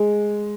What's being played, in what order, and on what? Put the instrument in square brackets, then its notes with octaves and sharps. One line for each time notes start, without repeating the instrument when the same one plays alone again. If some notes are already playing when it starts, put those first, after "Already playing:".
Already playing: [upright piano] G#3